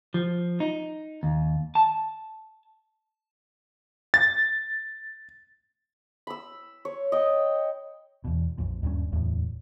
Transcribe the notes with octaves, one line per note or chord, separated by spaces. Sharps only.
F3
D#4
D#2
A5
A6
B5 E6
C#5
D#5 G5
E2 B2
A#1 F2 A#2
D#1 G2 A#2 C#4
D1 E2 A2